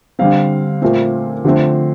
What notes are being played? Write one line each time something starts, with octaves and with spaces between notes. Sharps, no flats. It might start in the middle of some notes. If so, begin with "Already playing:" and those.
D3 G3 C4 F5
A#2 A3 C4
D3 F3 A3 C4